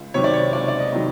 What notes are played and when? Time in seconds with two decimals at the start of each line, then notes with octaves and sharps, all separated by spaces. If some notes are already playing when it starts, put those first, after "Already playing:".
Already playing: C#2
0.14 C3 D#3 F#3 C#5
0.24 D5
0.34 C#5
0.53 C#2 D5
0.68 D5
0.79 D#5
0.92 C3 D#3 F#3